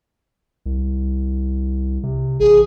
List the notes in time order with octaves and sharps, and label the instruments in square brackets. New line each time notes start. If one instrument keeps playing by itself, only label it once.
[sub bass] C2
C3
[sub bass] A1 [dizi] G#4